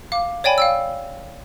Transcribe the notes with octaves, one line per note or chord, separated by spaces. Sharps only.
F5 D6
C#5 D5 G5 G#5 B5
F5 G5 E6